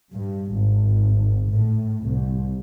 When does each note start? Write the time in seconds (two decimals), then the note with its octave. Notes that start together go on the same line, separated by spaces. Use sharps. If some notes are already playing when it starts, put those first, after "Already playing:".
0.12 G2
0.52 G#1
1.48 A2
2.06 C2